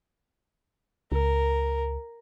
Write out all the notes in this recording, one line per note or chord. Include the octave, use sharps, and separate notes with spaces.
C#2 A#4